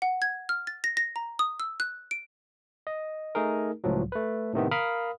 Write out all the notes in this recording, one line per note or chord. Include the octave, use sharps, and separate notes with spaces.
F#5
G#6
F6
A6
A#6
A#6
A#5
D#6
E6
F#6
D7
D#5
A3 D#4 G#4 A#4
C#2 A2 F3 F#3
A3 B4
A2 C3 D#3 B3
A#4 F5 B5 D#6 F6